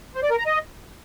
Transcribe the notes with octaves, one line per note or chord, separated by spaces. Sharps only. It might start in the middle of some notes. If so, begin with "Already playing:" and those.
C5
D5
A#4
A#5
D#5